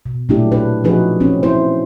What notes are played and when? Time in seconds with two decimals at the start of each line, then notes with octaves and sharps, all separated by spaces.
0.06 B2
0.29 A#2 F#3 A3 D4 E4 G4
0.52 D4 B4
0.84 F3 C#4 D#4 F#4 G#4 B4
1.20 C4 C#4
1.43 E4 C5